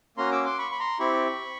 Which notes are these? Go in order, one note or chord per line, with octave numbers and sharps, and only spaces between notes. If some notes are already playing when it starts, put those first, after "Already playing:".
A#3 C#4 F#4 A#5 C6
D6 E6
C6 D6
B5 C#6
B5
A#5 C6
C4 E4 G4 B5 C#6